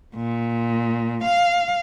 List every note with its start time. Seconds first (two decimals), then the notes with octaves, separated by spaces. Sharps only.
0.15 A#2
1.23 F5